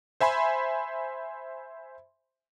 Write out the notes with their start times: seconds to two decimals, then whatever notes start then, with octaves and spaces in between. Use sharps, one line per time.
0.20 C5 E5 G#5 B5 C6